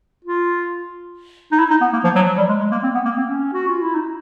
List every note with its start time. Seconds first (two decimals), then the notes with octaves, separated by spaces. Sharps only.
0.25 F4
1.52 D#4
1.59 E4
1.71 D#4
1.81 B3
1.93 A#3
2.04 F3
2.16 F#3
2.26 F#3
2.38 G3
2.49 G#3
2.61 G#3
2.72 A#3
2.83 C4
2.95 B3
3.05 A#3
3.17 C4
3.28 C#4
3.53 F#4
3.68 F4
3.82 E4
3.95 D#4